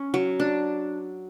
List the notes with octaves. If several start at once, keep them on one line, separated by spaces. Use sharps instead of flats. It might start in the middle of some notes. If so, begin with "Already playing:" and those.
Already playing: C#4
F#3
D4